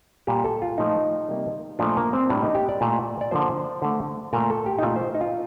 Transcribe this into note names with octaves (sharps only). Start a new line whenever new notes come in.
A#2 G3 A#3 G4
A4
F4
A#2 F3 A3 D#4
C3 G3 A#3
A#2 F3 A3 D4
A#3
C4
A2 G3 A#3 D4
D#4
G4
D5
A#2 A3
D5
D3 F3 A#3 C5
D3 A3
A#2 A3 A#4
A4
G4
D#4
A#2 A3 F4
C5
D#4
F4